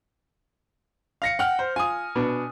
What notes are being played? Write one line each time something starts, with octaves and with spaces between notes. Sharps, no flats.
F5 A#6 C#7
F#5 G5 F6
C5
F4 G#5 D#6
B2 B3 D4